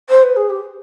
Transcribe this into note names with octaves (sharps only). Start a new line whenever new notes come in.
C5
B4
G#4
G4